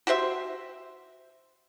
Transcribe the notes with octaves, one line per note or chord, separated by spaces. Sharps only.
F#4 G4 C5 E5